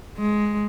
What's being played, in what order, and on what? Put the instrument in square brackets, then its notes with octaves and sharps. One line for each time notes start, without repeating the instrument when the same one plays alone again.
[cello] G#3